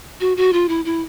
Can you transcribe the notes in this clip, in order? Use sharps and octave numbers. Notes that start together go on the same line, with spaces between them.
F#4
F#4
F4
E4
E4